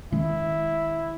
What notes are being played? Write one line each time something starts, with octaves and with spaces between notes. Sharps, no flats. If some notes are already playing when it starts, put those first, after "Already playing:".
D#3 G#3 C#4 E4